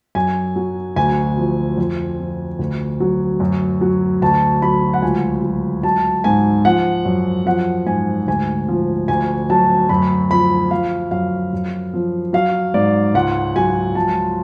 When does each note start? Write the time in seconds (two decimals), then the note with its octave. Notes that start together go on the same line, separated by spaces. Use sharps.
0.15 F#2 G#5
0.56 F#3
0.96 D2 G#5
1.37 F3
1.77 F2
2.19 F3
2.59 D2
3.00 F#3
3.40 F#2
3.81 F#3
4.22 D2 A5
4.62 F#3 B5
4.94 F#5
5.02 C#2 G#5
5.43 F#3
5.83 F#3 A5
6.24 G#2 G#5
6.65 F3 F#5
7.05 F#2
7.46 F3 F#5
7.86 G#2 G#5
8.27 D2 G#5
8.68 F3
9.08 D2 G#5
9.50 F#3 A5
9.89 F#2 B5
10.30 F3 B5
10.71 F3 F5
11.11 F#2 F5
11.53 F#2
11.94 F3
12.33 F#3 F5
12.74 G#2 D5
13.14 C#2 F#5
13.56 F#3 G#5
13.95 F3 A5